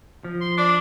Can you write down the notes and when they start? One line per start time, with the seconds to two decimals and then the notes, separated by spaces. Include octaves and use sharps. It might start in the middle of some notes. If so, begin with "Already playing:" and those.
0.24 F3
0.41 C6
0.57 D4 D5